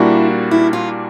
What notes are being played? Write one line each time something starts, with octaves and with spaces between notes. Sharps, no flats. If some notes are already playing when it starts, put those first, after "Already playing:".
Already playing: A#2 G3 A#3 D4 E4 F#4
E4
F4